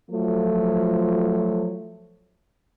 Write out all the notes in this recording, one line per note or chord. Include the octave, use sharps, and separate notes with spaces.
F3 F#3 A3